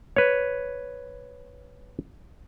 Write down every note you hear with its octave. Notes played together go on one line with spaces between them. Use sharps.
B4 C#5